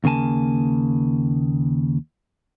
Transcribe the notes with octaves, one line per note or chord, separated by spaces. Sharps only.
D#2 C#3 A#3 G#5 A5